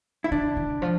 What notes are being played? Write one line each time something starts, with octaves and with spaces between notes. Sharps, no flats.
E4
D3 D4
D3
F3